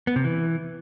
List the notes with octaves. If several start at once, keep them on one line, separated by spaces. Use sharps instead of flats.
B3
C3
E3